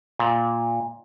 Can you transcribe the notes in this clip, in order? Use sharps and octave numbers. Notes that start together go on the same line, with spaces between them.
A#2